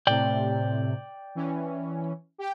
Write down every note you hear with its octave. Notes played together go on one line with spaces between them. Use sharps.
A2 C3 D5 G5
E3 C#4
G4 G5